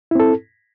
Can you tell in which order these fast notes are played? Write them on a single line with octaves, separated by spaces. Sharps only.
E4 C4 A4